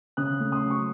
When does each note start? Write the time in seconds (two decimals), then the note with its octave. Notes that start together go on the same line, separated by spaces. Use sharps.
0.17 C#3 D#6 F#6
0.40 A3
0.52 C6 D#6
0.63 F#3
0.70 C#6